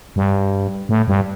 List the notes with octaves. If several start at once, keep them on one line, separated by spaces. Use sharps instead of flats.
G2
A2
G2